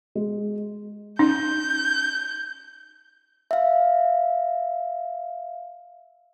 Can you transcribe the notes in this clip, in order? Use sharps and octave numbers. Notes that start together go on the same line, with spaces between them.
G#3
C#4 D#4 G6
E5 F5